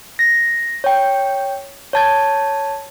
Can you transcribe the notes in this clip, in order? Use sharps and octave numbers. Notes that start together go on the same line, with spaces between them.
A#6
C#5 G5
C#5 A5 G#6